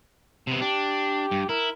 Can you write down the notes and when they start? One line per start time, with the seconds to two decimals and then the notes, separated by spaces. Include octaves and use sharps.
0.47 C3 B3
0.62 D4 G4
1.31 G2
1.49 E4 A#4